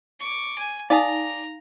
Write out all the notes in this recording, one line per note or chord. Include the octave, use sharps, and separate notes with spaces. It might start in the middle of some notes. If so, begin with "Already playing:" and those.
C#6 D6
G#5
D#4 G#4 D5 F5 A#5